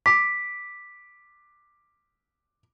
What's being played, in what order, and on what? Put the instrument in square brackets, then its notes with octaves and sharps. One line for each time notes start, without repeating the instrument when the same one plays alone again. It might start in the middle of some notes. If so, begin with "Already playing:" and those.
[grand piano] D6 [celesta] B6